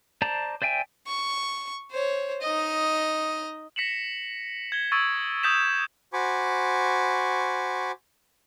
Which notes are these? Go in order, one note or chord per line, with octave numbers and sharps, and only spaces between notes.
C5 D5 A5 A#5
C5 D5 E5 G5 G#5
C#6
C5 C#5
D#4 D#5
A#6 B6 C#7 E7 F#7
G#6 G7
C#6 D#6 E6 G#6 A6 D7
D#6 G6 A6 B6 E7
F#4 C5 G#5 B5 C#6 D6